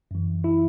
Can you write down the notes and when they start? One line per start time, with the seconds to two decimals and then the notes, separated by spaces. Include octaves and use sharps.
0.11 F#2 E3
0.44 E4